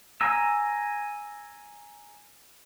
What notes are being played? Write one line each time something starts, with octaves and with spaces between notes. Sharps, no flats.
G#5 A#5 E6